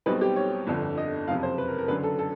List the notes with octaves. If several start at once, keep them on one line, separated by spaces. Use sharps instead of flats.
B1 B2 G3 C4 D#4 B4
G4
C#5
G1 F2 D3
D#5
F#1 F2 C3 F5
C5
B4
A#4
A#4
F#1 F#2 D3 B4
A4
A4